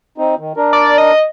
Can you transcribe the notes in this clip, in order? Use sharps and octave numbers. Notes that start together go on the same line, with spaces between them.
C4 D#4
D#3
D4 A#4
D5
D#5